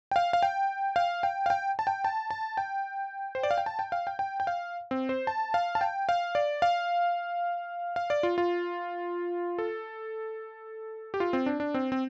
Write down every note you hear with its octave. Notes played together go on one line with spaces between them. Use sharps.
G5
F5
F5
G5
F5
G5
F5
G5
A5
G5
A5
A5
G5
C5
D5
F5
G5
A5
G5
F5
G5
G5
G5
F5
C4
C5
A5
F5
A5
G5
F5
D5
F5
F5
D5
F4
F4
A4
G4
F4
C4
D4
D4
C4
C4